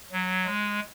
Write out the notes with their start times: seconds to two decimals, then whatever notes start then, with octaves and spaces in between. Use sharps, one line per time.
0.12 F#3
0.45 G#3